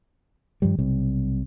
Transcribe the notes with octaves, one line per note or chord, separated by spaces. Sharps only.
G2 D#3 F3 G3
B1 C3 G3